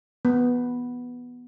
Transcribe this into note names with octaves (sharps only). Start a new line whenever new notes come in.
B3